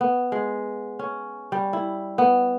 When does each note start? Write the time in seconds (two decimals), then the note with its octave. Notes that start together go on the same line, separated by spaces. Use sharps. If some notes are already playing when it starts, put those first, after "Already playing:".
0.01 B3
0.32 G#3
0.99 C#4
1.52 G3
1.73 E4
2.18 B3